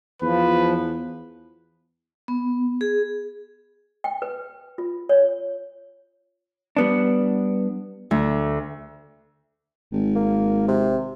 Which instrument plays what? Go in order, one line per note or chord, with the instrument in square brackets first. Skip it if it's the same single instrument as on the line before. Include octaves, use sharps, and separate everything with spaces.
[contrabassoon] E2 [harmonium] F3 [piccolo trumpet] B4
[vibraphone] B3
G#4
[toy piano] G5
B4
F4
C#5
[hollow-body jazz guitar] G3 B3 D4
[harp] D2
[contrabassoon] G#1
[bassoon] A#3
C3